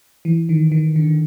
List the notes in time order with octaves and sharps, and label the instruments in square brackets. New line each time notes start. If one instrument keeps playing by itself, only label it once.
[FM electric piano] E3
D#3
D#3
D3